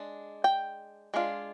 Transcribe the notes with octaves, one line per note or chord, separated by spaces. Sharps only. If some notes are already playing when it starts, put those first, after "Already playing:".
Already playing: G#3 D4
G5
G#3 D4 F4